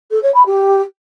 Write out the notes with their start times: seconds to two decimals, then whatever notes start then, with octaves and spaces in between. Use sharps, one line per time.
0.11 A4
0.22 C#5
0.34 B5
0.46 G4